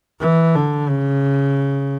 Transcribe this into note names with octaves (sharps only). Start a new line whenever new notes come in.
E3
D3
C#3